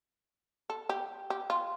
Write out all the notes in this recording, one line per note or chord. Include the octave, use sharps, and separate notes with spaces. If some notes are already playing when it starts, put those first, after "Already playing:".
A4
G4
G4
F4